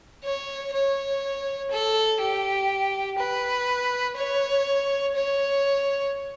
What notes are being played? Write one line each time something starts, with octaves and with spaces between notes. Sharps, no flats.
C#5
C#5
A4
G4
B4
C#5
C#5